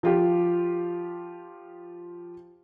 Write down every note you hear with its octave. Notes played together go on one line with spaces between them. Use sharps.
F3 F4 G4